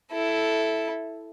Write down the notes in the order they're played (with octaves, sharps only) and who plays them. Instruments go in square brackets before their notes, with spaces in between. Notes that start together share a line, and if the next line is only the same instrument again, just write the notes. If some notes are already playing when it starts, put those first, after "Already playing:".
[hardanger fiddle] E4 A4